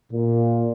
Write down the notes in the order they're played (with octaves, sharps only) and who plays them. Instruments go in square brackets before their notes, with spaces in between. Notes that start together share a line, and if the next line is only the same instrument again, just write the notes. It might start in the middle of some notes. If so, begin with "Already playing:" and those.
[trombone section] A#2